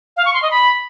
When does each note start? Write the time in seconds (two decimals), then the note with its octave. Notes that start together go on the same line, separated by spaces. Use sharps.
0.17 F5
0.25 C#6
0.34 C6
0.42 D#5
0.51 B5